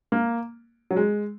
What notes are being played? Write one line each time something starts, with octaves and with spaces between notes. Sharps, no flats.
A#3
F#3
G#3